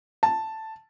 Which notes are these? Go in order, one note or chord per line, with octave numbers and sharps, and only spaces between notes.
A5